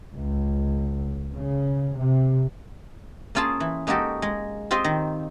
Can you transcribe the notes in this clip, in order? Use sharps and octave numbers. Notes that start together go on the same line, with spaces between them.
C#2
C#3
C3
A#3 C#4 F4 G#4 A5
E3
G#3 A#3 D#4 F#4 G4 A4
G#3
C4 F4 G4 C5 D#5
D#3